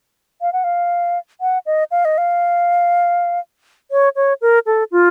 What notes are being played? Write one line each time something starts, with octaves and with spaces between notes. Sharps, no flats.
F5
F#5
F5
F#5
D#5
F5
D#5
F5
C#5
C#5
A#4
A4
F4